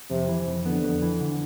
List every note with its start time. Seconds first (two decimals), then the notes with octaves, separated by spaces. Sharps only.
0.10 F2 C3
0.28 E3
0.47 F2
0.65 D3 B3
0.83 F2
1.02 E3
1.21 D3